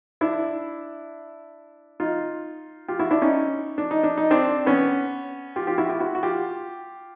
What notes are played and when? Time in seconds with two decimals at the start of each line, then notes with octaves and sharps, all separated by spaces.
0.21 D4 E4
2.00 D#4 F4
2.88 F4 G4
2.99 E4 F#4
3.11 D4 E4
3.22 C#4 D#4
3.78 D4
3.91 D#4
4.03 D4
4.17 D#4
4.31 C4 D4
4.66 B3 C#4
5.56 F4 G4
5.67 F4 G4
5.78 E4 F#4
5.89 F4 G4
6.00 E4 F#4
6.15 F#4
6.23 F4 G4